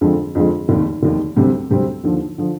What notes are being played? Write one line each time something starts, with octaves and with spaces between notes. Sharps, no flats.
F2 D3 F3 G#3
F2 D3 F3 G#3
F1 D#2 D#3
F1 D#2 D#3
D2 C3 G3 C4
D2 C3 G3 C4
D#2 D3 F3
D3 F3